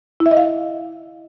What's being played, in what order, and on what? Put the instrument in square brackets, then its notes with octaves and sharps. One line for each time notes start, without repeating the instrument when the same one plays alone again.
[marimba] E4
E5
D#5
F5